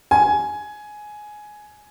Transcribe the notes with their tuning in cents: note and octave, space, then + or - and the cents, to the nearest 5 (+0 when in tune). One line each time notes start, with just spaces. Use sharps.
G#5 +10